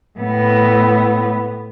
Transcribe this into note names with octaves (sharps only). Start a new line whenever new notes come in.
A2 B3